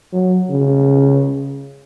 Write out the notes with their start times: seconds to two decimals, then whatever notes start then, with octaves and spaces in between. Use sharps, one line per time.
0.13 F#3
0.50 C#3